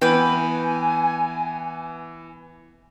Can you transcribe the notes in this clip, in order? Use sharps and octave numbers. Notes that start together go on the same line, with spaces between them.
E3 B3 B4 G5 G#5